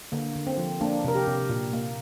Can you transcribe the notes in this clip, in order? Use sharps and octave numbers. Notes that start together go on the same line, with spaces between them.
D3 A#3
D3
C4
F3
A#3 D4
C3 A#4
G4
C3
A#2
A#3